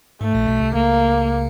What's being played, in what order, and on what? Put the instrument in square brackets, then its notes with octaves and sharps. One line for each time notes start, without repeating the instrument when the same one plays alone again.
[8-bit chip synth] G#2 [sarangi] A3
[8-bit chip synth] A#1 A#2
B1 B2
C2 C3
[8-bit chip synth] C#2 C#3 [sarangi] A#3